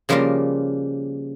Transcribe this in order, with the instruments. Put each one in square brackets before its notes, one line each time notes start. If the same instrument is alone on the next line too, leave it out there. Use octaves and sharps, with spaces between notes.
[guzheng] C#3 F3 G3 A#3 F4 A#4